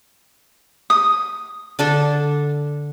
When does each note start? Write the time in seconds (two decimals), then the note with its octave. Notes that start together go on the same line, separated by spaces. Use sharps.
0.90 D#6
1.79 D3 D4 A4